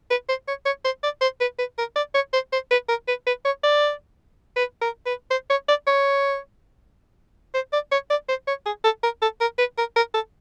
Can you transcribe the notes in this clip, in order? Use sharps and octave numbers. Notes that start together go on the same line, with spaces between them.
B4
C5
C#5
C#5
C5
D5
C5
B4
B4
A#4
D5
C#5
C5
C5
B4
A#4
B4
B4
C#5
D5
B4
A#4
B4
C5
C#5
D5
C#5
C5
D5
C#5
D5
C5
C#5
G#4
A4
A#4
A4
A#4
B4
A#4
A#4
A4